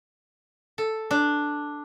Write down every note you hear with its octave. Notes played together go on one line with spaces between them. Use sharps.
A4
D4